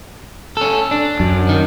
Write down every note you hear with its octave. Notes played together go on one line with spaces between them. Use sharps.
C#4 A4
D4
F#2
D#3